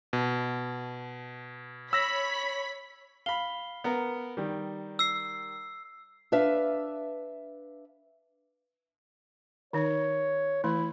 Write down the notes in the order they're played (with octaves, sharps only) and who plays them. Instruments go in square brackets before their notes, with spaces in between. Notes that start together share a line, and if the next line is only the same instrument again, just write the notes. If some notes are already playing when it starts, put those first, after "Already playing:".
[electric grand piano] B2
[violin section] C#5 B5 B6 [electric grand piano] E6 A#6
[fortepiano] F5 B5 [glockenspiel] G7
[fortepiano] B3 A#4
D#3 G3
[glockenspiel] E6 C7
[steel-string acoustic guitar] D4 B4 E5 F5
[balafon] D#3 D#4 [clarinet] C#5
[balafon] E3 A3 [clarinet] E4